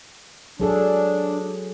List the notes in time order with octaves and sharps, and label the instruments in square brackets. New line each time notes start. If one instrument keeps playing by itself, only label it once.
[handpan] F#3 G#4 A4 [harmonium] D4